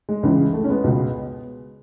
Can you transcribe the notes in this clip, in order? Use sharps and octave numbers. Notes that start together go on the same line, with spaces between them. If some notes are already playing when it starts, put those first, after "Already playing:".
G#3
C#2 C#3 E3
A3
C#4
G#3 B3
C#2 B2